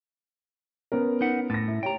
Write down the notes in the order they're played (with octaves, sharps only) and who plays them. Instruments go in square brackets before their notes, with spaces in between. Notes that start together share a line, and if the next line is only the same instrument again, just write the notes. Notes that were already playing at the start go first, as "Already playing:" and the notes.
[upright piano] B3 C#4 A#4
[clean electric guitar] D#4 B4 F#5
[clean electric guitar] A2 [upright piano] A6 A#6
[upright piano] E4
[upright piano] G4 C#5 [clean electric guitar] G5 A#5